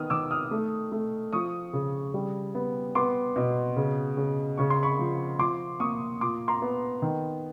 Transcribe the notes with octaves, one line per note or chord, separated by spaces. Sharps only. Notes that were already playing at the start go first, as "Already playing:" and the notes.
Already playing: D#3 B3 D#6 F6
D#3 D6 E6
D#6 F6
A3
A3
F3 C#6 D#6
C#3
G3
B3
B3 C6 D6
B2
C#3
C#3
C#3 C#6
C6
B5 C#6
F3
F3 C6 D6
A#3 C#6 D#6
A#2 C6 D6
A#5 C6
B3
D#3